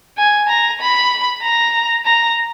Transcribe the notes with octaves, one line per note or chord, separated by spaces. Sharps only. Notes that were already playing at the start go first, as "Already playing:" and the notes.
G#5
A#5
B5
A#5
A#5